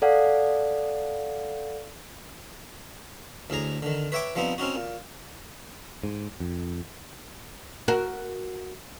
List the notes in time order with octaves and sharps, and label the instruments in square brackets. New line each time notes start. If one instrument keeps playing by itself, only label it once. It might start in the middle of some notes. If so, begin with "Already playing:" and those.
[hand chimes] A4 D5 F5 F#5
[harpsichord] D2 A2 G#4 A#5
D3 D#3
B4 C#5 E5 G5 D6
F3 G3 B3 C4 D#4
C4 C#4 D#4 F#4
A#2
[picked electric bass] G#2
F2
[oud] F#4 A#4